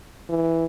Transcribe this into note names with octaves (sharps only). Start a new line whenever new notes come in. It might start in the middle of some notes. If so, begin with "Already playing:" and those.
E3